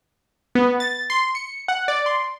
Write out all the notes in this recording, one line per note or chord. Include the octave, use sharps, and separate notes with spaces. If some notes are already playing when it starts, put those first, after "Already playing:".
B3
A6
C6
C#7
F#5
D5
C6